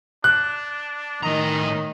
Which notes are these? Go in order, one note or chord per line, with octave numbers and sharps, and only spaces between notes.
D4 F#6
A2 D#3 D#5 A#5